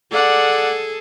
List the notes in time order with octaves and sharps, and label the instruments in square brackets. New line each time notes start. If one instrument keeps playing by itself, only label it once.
[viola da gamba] G#4 A4 [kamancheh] D5 F#5